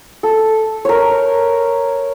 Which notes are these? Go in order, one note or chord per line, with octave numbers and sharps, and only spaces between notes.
A4
A#4 C#5